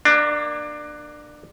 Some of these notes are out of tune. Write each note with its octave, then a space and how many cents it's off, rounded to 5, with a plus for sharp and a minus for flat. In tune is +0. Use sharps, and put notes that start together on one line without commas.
A#3 +0 D4 +20